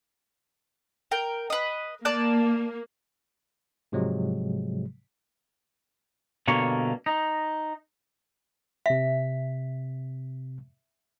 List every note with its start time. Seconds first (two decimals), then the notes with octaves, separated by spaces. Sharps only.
1.11 A#4 G5
1.50 B4 D#5
2.05 A#3 D5 A5 F#6
3.92 G#2 C3 F3 F#3 G#3
6.48 G2 B2 D3 A#3 C#5
7.06 D#4
8.86 C3 E5 B6